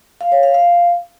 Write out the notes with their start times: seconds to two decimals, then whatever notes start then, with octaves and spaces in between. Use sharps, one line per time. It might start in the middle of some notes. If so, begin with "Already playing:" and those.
0.21 F5
0.32 C#5
0.43 F5
0.54 F5